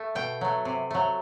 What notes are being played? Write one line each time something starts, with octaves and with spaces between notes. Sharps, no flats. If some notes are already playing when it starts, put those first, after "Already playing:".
Already playing: A3
B2 G5
F#3 A3
C3
F#3 A3